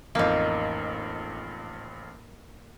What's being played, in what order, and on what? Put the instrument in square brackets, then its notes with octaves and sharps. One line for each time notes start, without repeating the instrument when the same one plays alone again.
[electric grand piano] A1 F2 [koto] A#3 D#4